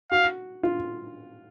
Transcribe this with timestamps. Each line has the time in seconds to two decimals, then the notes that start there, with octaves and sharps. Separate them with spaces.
0.11 F#4 F5
0.63 F4